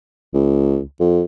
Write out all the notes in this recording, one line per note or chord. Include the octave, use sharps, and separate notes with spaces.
C#2
F2